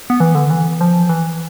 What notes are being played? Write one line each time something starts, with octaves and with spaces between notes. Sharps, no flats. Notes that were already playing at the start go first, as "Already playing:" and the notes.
B3
E3
D3
E3
F3
E3